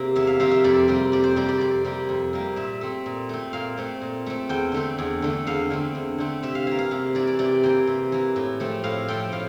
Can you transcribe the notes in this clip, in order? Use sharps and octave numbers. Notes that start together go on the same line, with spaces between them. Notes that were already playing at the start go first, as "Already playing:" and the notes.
Already playing: C3 A#3 G4
E2 E5
F5
C3 F3 A#3 F5
E5
F2 D5
C3 G3 A#3
F2 D5
C5
C3 G3 A#3 D5
D5
F2 D5
C3 G3 A#3
F2
C3 G3 A#3
A#2 E5
A3 C4
A#2
A3 C4
A#2 F5
A3 C4
A#2
A3 C4
E2 G5
D3 A3 C4
E2
D3 A3 C4
E2 F5
D3 A3 C4
E2
D3 A3 C4
C3 E5
F5
E3 A#3 F5
F5
C3 F5
E3 A#3 D5
D5
C3 D5
E3 A#3 G5
C3
E3 A#3
A2
F3 A3 C4
A2 F5
F3 A3 C4 G5
A2 F5